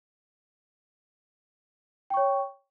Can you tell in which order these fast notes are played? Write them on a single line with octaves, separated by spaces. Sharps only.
G5 C#6 C#5